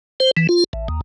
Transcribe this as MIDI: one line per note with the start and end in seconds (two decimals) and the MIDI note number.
0.20 0.31 72
0.37 0.47 52
0.49 0.64 65
0.73 0.88 33
0.88 1.01 39